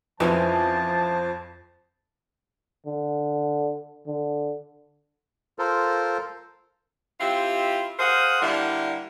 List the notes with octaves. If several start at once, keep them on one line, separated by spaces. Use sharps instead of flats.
F2 E3 F3 G#3 C#4 C5 A5
D3
D3
F4 A4 A#4 C5
C4 E4 F4 G4
G#4 A#4 C5 F5 F#5
D3 G3 A#3 E4